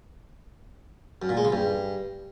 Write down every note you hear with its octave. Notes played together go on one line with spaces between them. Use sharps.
F#2
A#2
G#3
C#3
G2